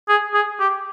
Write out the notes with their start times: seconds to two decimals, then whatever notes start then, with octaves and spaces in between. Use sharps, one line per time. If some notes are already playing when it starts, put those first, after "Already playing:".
0.09 G#4
0.34 G#4
0.60 G4